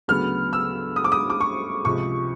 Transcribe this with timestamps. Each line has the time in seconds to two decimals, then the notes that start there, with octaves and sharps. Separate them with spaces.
0.08 D2 C#3 F#3 B3 F6
0.53 E6
0.96 D#6
1.04 D6
1.12 D#6
1.30 D6
1.40 C#6
1.85 C#2 C3 F3 C#6